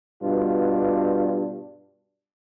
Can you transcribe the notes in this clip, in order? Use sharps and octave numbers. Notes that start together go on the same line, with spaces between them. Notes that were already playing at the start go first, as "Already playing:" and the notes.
G2 B2 D4 F4